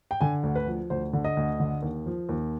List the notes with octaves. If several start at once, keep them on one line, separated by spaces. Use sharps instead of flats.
G5
D3 G#5
D2
B4
F3
D2 C5
D3
D#5
D2
D3
D#2
F3
D#2